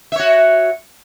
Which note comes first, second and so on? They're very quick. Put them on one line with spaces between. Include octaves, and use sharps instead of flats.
E5 C#5 F#4